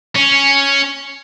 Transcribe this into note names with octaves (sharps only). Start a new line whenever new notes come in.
C#4